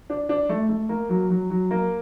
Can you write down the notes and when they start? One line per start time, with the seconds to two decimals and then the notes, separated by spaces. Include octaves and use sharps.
0.10 D4
0.29 D4
0.49 A3
0.69 A3
0.89 A#3
1.09 F#3
1.30 F#3
1.50 F#3
1.71 A#3